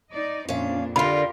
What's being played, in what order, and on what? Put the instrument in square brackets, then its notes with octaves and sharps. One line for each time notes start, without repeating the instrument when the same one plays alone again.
[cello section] D#4 D5 D#5
[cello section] F2 A#2 D4 [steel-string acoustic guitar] C#4 F5
[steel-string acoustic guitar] D3 G3 [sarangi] F4 [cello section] G4 A#4 [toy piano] B5